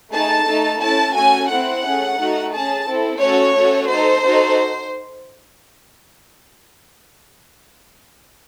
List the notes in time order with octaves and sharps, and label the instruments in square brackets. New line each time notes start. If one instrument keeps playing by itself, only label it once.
[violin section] A3 D#4 G#4 A5
A3 D#4 A4
A3 C#4 E4 A5
A3 C#4 F#4 A4 G#5
A3 C4 E4 F#5
A3 C#4 G#4
A3 D#4 F#4
C#4 G#4 A5
C4 E4 A4
A3 C#4 F#4 A4 C#5
A3 C#4 F#4 A4
D#4 A4 C5
D#4 F#4 A4